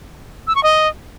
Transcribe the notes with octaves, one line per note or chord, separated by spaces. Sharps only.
E6
C#6
D#5